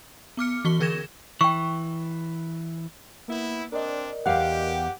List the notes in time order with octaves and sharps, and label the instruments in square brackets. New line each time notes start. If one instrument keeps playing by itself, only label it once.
[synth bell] B3 D6 F6 C#7
E3 F#4 C#6 G7
D3 G#4 A#4 G#6 A#6 E7
[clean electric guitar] E3 [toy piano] G5 C#6
[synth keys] A#3 [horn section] B3 E4
[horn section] C4 D4 [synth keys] A#4 D5 D#5
[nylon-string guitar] E2 F5 [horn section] G4 [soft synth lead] F#5